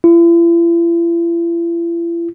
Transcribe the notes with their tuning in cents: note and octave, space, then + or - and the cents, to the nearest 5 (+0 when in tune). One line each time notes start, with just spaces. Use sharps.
E4 +45